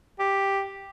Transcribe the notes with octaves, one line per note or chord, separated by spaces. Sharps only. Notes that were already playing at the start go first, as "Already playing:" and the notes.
G4